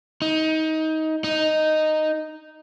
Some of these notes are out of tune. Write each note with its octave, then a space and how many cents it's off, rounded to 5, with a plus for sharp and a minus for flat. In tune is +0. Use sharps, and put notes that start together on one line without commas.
D#4 +20
D#4 -5